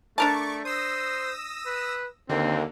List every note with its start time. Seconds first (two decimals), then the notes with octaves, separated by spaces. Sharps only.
0.18 A3 D4 A#4 A5 C#6 D6
0.65 C5 D#6 E6 A#6
1.66 B4
2.29 D#2 D3 A#3 C4